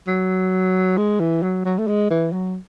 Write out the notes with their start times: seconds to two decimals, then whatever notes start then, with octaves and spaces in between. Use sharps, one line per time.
0.07 F#3
0.98 G#3
1.20 E3
1.43 F#3
1.65 F#3
1.79 A3
1.88 G#3
2.10 E3
2.33 F#3